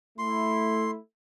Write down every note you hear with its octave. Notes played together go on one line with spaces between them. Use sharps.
A3 E4 C6